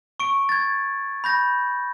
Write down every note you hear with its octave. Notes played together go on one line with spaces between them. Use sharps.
C#6 D7
G#6 A6
B5 G6 A#6